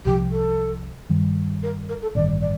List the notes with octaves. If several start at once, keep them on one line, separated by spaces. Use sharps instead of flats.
C2 C3 F3 G4
A4
G2 D#3 G3
A#4
A#4
A4
A1 G2 D#3 D5
D5